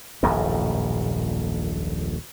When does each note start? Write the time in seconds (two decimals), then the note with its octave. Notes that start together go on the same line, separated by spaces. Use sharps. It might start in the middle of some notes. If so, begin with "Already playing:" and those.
0.23 D#1 A#1 F#2 A2